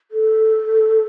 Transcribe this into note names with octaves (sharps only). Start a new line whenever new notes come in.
A4